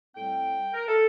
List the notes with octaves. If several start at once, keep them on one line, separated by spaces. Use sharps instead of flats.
A2 G3 C4 G5
A#4
A4